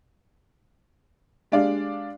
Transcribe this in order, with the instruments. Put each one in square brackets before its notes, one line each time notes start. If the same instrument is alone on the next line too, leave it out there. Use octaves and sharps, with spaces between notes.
[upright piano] G#3 D4 G4 D5 F5